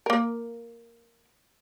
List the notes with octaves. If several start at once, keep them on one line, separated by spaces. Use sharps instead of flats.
A#3 A#4